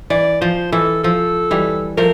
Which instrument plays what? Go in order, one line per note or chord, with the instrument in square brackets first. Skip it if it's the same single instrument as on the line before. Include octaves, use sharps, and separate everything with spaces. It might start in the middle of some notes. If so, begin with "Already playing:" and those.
[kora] E3 [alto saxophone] D5
[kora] F3 [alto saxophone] C5
[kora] E3 [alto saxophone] A4
[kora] F3 [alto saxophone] A4
[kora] E3 G3
[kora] F3 A3 [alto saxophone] A#4